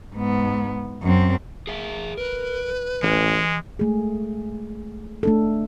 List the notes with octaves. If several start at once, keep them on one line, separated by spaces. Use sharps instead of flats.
G#2 B3
F#2 C4
G#4 A#4 E5
A#4 B4
A1 E3 G#3
G#3 A3 G#4
A3 D4 A4